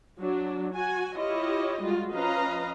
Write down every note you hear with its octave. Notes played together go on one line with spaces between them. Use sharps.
F#3 D4
F#4 G#5
E4 F4 G4 C#5 D#5
G3 G#3 F4 F#4
F3 C#4 B4 D#5 F5 A#5